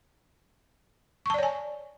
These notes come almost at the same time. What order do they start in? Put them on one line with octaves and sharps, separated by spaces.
C#6 A5 D5 C#5 G#5